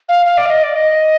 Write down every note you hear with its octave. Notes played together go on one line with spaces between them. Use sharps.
F5
F5
D5
F5
D#5
D5
D#5